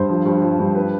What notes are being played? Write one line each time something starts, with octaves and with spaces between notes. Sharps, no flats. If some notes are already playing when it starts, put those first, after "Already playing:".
Already playing: G2 C5
F3
G2
F3
G2
B4